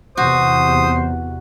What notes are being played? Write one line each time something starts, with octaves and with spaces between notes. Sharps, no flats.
E2 C3 F#4 C5 D#6